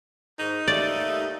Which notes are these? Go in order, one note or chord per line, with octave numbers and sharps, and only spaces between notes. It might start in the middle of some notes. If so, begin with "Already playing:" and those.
G#2 D#4
D#2 G3 A3 D5